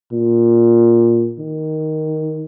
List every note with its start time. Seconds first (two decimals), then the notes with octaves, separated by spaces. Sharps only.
0.12 A#2
1.39 D#3